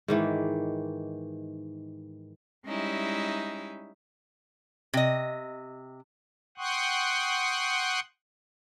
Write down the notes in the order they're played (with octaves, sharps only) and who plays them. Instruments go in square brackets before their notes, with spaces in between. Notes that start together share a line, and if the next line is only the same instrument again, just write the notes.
[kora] G#2 D#3 E3
[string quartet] G3 G#3 C#4 D#4 E4 E5
[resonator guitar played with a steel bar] C3 D#5
[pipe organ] F#5 G5 C6 C#6 D#6 F#6